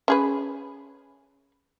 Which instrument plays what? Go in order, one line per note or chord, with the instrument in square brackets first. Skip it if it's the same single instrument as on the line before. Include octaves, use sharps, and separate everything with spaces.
[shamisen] C#4 G#4 B4